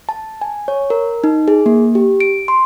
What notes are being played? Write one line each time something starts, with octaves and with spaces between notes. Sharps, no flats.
A5
G#5
C#5
A#4
D#4
G#4
A#3
G4
D7
C6